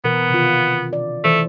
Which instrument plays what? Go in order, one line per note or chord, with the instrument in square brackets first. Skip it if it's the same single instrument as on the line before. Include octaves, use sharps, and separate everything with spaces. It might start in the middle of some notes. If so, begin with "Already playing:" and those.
[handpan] B2 E3 A#4 [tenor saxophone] B3
[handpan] C3 D#3 F4
D5
[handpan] D#3 E3 C5 [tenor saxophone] A3